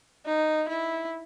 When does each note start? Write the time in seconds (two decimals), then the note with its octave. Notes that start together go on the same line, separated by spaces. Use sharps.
0.26 D#4
0.69 E4